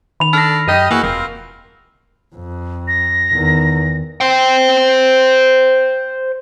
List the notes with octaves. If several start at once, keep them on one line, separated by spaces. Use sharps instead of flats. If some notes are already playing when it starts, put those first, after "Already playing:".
D#3 B5 F7
D4 A4 F6 A#6
F#2 G4 D#5
E3 A#3 F#4 G#4
E1 C4 F4 A#4
F2
A#6
E2 D#3
C5 G5